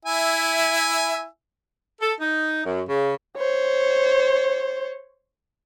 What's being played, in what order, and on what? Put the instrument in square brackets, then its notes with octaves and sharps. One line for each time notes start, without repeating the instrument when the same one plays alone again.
[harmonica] E4 E5 G#5
[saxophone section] A4
D#4
F#2
C#3
[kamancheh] C5 C#5